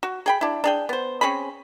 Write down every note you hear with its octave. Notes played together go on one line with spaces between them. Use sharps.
F#4
G#4 G5 B5
D4 E4
D4 G#4 G5
B3 C5
C4 C#4 G#4 B5